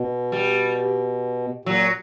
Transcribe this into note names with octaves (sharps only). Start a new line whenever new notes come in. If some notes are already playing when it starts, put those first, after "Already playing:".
Already playing: B2
G3
A#2 F#3